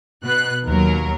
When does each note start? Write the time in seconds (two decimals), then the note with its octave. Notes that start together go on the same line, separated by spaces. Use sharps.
0.24 B2 B4 F#6
0.65 D#2 F#3 A#4